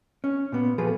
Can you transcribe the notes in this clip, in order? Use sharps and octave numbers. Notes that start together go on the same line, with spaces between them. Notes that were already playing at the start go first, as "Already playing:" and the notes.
C#4
A#2 B3
A#2 F3 F#3 G#4 A4 B4